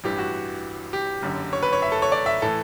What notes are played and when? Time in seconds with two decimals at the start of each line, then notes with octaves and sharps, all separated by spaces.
0.04 A1 G2 E3 G4
0.18 F#4
0.93 G4
1.22 F#1 F#2 D3
1.53 C#5
1.63 B4
1.73 C#5
1.82 E5
1.92 A4
2.02 C#5
2.12 D5
2.26 E5
2.42 A2 E3 A4